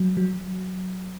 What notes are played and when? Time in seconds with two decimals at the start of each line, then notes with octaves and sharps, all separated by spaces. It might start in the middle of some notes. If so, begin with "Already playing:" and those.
Already playing: F#3
0.17 F#3